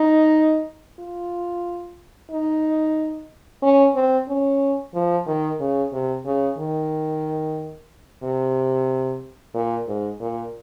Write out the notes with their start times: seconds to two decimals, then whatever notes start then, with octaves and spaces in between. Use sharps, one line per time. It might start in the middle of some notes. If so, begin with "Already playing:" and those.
Already playing: D#4
0.99 F4
2.31 D#4
3.62 C#4
3.95 C4
4.28 C#4
4.94 F3
5.27 D#3
5.60 C#3
5.93 C3
6.26 C#3
6.58 D#3
8.23 C3
9.54 A#2
9.87 G#2
10.20 A#2